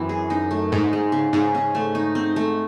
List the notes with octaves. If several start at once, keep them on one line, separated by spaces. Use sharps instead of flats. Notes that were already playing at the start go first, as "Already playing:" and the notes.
Already playing: F#2 E3 C4 E4
G#4
D#4
A3
G#2 D#4
G#3
C#3
G#2 G#4
C#4
A3
D#4
C4
A3